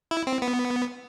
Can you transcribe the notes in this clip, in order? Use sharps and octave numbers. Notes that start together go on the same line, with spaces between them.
E4
C4
B3